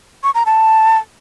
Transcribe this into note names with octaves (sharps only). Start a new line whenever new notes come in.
C#6
A#5
A5